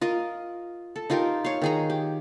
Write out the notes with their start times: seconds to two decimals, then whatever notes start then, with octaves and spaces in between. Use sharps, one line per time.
0.01 F4 A#4 D#5
0.96 A4
1.10 D#4 F4 G4 A#4
1.45 C#5 F5
1.62 D#3 G#4 A#5
1.90 G4